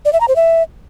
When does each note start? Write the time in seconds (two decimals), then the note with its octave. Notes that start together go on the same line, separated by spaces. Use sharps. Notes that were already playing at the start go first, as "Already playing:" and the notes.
0.05 D5
0.13 E5
0.20 A#5
0.28 C5
0.36 E5